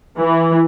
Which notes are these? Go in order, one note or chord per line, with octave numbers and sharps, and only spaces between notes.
E3